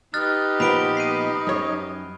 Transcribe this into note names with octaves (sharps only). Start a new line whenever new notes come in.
D#4 G4 B4 F6 F#6 A6
A#2 F3 B3 B5 D7 G7
C7 D#7
F#2 C#5